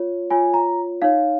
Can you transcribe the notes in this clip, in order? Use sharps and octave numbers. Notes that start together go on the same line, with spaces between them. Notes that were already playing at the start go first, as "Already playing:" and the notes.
Already playing: F4 C#5
F4 C#5 G#5
A#5
D#4 C#5 F5